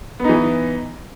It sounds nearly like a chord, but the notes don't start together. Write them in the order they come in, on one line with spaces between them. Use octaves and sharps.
B3 D#4 E3